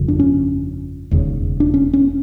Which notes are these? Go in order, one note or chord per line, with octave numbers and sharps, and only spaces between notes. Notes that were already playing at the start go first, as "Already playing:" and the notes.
Already playing: G1 F2 C#3
D4
C#4
E1 D#2 C#3
D4
C#4
C#4